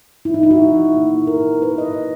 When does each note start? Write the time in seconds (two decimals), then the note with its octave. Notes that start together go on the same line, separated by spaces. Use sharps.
0.25 E4
0.34 D#4
0.43 E4
0.51 F#4
0.94 A#2 A#3 D#4
1.27 A#4
1.62 B4
1.78 D#5